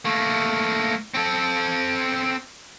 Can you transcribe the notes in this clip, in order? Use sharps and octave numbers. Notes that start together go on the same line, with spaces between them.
A3 A#3
C4 A4